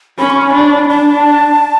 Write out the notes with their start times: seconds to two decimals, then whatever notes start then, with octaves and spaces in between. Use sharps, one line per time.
0.19 C#4 B5
0.30 C#6
0.42 B5
0.55 D4
0.89 D4 A5